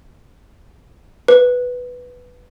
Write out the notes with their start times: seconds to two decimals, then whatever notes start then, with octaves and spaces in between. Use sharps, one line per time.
1.28 B4